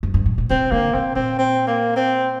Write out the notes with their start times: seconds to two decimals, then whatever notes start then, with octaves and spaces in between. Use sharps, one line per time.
0.03 F#2
0.14 G2
0.26 A2
0.38 A#2
0.50 C3 C4
0.72 D3 A#3
0.94 C3 C4
1.16 A#2 C4
1.39 C4
1.67 A#3
1.97 C4